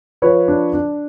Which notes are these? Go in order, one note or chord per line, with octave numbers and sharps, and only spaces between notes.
F3 B4 C#5
D4
D4